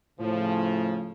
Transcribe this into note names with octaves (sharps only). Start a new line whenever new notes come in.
A2 C#3 F3